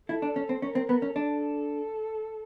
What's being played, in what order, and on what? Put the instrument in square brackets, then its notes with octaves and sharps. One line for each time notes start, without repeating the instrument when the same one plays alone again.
[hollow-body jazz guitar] E4 [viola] A4
[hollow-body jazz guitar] D4
C#4
C4
[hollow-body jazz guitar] C#4 [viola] A#4
[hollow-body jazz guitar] C4
B3
C#4
[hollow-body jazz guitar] D4 [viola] A4